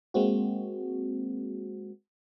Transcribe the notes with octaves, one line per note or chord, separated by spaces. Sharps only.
G#3 A#3 C4 F#4